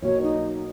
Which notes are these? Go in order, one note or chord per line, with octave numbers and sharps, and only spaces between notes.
B1 B2 F#3 A#3 C#5
D#4